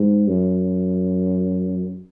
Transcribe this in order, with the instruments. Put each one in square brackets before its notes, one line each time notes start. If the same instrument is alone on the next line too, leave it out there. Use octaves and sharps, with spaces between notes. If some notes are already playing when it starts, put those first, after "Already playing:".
Already playing: [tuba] G#2
F#2